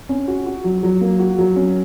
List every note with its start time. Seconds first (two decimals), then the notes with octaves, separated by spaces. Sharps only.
0.09 C#4
0.28 F#4
0.46 F#4
0.64 F#3
0.83 F#3
1.01 A#3
1.19 F#4
1.38 F#3
1.56 C#4